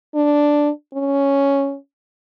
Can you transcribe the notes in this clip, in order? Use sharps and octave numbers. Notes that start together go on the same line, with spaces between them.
D4
C#4